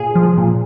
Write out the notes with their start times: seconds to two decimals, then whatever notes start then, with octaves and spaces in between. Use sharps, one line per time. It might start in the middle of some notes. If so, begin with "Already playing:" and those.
Already playing: A#2 G#4
0.15 F3
0.37 A#2